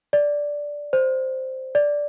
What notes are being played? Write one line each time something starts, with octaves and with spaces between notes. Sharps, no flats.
D5
C5
D5